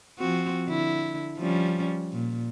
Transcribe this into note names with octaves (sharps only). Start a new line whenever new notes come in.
F3 C4 F#4
D3 E4
F3 G3 C#4
A#2